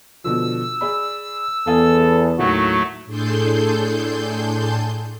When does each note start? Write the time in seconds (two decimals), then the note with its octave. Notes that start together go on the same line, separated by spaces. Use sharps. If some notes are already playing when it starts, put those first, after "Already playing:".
0.24 B2 D3 F3 E6
0.81 G#4 D5 B5
1.67 E2 A4 F5 G#5 D#6
2.39 D#2 A2 F#3 A3 F#4
3.05 A2 D4 G#4 A4 C6 G6